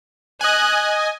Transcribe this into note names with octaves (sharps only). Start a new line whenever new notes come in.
D#5 G#5 D#6 F#6